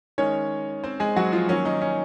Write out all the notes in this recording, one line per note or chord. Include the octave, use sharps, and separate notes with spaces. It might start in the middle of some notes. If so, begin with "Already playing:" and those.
D#3 G#3 C#4 C#5
C4 C5
G#3 G#4
F#3 F#4
F3 F4
D#3 F#3 A#3 C#4
D#3 D#4
C#4